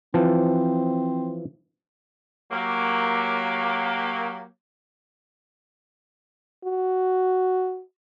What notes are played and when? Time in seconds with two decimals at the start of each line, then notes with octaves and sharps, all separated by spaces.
0.14 E3 F3 C4 A5
2.52 F#3 A#3 G4
6.65 F#4